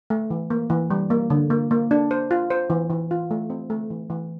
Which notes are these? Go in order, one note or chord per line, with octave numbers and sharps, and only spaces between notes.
A3
E3
A#3
E3
G3
A#3
D3
A#3
A#3
D4
C5
F4
C5
E3
E3
F4
A3
C4
A3
E3
E3